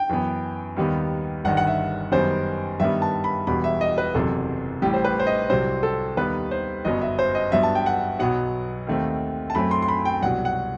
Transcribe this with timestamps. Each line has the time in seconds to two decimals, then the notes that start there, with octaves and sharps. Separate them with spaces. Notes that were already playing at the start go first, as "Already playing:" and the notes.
Already playing: G5
0.09 F#2 E3 B3
0.76 D#2 D#3 G3 B3
1.44 G1 G2 D#3 F#5
1.57 F#5
1.67 E5
2.12 F#2 D#3 G3 B3 C5
2.80 G2 D#3 G3 B3 E5
3.02 A5
3.24 B5
3.47 E1 E2 B2 G3 B5
3.64 E5
3.81 D#5
3.98 B4
4.14 F#1 E2 C3 F#3 A4
4.82 A1 A2 G3 G4
4.94 C5
5.05 B4
5.19 C5
5.27 D#5
5.49 C2 C3 F#3 C4 C5
5.83 A4
6.17 D#2 D#3 G3 B3 B4
6.51 C5
6.85 G1 F#2 F#3 B3 D#5
7.02 E5
7.19 C5
7.35 D#5
7.52 G2 F#3 B3 E5
7.63 A5
7.75 G5
7.86 F#5
8.19 B1 B2 F#3 B3 F#5
8.87 D#2 D#3 A3 C4
9.50 A5
9.55 F#2 F#3 A3 C4 B5
9.71 C6
9.82 C6
9.88 B5
10.05 G5
10.22 C2 B2 F#3 F#5
10.45 F#5